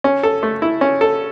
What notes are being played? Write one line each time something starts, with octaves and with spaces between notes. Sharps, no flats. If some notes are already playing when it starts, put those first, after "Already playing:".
C#4
A4
A3
E4
C#4
A4